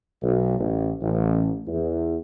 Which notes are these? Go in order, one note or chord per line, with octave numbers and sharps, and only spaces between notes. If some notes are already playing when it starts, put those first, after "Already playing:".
B1
A1
A1
E2